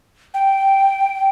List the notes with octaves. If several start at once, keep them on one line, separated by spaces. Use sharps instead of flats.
G5